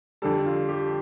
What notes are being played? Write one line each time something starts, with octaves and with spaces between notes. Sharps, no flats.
F2 D3 G3 A4
F4
G4